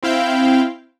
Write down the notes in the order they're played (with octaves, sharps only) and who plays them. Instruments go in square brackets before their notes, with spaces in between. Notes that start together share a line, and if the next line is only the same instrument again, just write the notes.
[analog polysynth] C4 E4 F5 G5